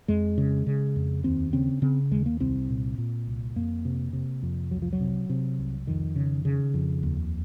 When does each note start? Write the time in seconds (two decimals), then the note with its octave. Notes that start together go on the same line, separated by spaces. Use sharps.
0.08 F2 G#3
0.38 C#3
0.67 C#3
0.96 F2
1.24 D#2 C4
1.53 C#3 C4
1.82 C#3 C4
2.11 D#2 G#3
2.26 A#3
2.40 C2 C4
2.69 A#2
2.98 A#2
3.27 C2
3.56 F2 A#3
3.85 C3
4.13 C3
4.43 F2
4.71 C2 F#3
4.82 F3
4.93 F#3
5.01 C3
5.29 C3
5.59 C2
5.87 F2 D#3
6.16 C#3
6.45 C#3
6.74 F2
7.03 D#2